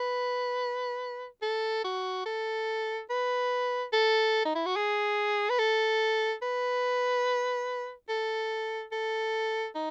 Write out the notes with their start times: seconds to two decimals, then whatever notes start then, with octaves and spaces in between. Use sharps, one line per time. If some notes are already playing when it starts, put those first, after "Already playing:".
Already playing: B4
1.42 A4
1.84 F#4
2.26 A4
3.10 B4
3.93 A4
4.45 D#4
4.55 E4
4.66 F#4
4.76 G#4
5.50 B4
5.59 A4
6.42 B4
8.09 A4
8.92 A4
9.75 D#4